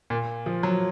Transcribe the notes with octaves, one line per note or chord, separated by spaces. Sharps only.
A#2
F3
F#3